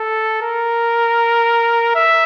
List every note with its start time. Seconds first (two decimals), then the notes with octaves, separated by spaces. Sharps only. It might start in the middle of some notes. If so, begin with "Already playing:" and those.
Already playing: A4
0.42 A#4
1.95 E5